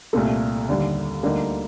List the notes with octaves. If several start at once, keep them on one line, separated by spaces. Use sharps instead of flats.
C2 A#2 A3
D#2 D3 G3
D2 D3 G3 A#3 D#4